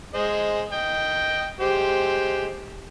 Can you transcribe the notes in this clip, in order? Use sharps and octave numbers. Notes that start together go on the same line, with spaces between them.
G#3 C5 D#5
D#5 G5
G#3 G4 C5